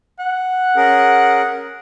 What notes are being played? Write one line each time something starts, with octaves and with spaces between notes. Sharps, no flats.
F#5
C#4 G#4 A#4